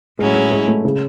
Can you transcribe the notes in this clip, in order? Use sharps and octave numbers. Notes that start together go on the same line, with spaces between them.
A2 F#3 G#3 C#4 E4
G#3
G#3
A3
C#3